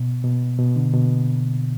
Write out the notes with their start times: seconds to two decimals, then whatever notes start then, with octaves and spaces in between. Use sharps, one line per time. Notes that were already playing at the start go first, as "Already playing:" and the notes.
Already playing: B2
0.24 B2
0.58 B2
0.76 D3
0.93 B2